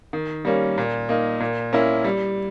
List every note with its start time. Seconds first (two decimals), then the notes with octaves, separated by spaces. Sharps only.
0.13 D#3
0.45 G3 A#3 C#4
0.78 A#2
1.09 A#3 D#4
1.40 A#2
1.73 A#3 C#4 E4
2.04 G3